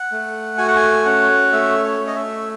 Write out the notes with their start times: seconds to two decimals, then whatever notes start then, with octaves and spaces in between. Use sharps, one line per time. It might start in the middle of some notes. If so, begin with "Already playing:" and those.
Already playing: F#5
0.12 A3
0.58 F#4 G#5
0.68 F#5
0.76 G#5
1.05 C#4 F#5
1.52 A3 E5
1.85 C#5
2.00 A3
2.07 D#5
2.16 E5